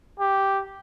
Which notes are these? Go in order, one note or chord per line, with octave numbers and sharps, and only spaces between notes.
G4